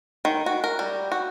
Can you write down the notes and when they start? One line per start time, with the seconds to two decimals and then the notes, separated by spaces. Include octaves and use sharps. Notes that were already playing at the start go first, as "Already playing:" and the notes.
0.25 D#3
0.46 F#4
0.64 A#4
0.79 G3
1.12 F#4